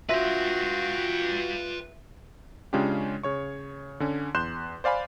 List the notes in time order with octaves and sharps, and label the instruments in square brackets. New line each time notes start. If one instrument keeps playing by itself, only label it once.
[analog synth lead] F4 [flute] F#4 [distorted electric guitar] B4 G5 [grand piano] E5 C6 A#6
[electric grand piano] C#3 G#3 C#4 D4 F4 G4
C#3 C#5 C#6
D3 C#4
E2 C6 F#6 G6 E7
C5 D5 F5 G#5 B5